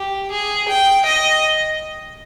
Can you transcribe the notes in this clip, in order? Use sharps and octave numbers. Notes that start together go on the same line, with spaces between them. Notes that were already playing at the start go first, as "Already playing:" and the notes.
Already playing: G4
G#4
G5
D#5